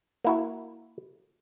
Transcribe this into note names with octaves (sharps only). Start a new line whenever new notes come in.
A#3 E4 F#4